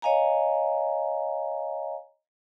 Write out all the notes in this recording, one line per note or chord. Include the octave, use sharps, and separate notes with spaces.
C#5 D#5 F5 G#5 A#5